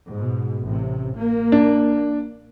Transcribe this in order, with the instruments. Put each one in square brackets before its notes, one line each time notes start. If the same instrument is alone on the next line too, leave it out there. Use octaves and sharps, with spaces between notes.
[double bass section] G#2 B2
A1 C3
A#3
[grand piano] D4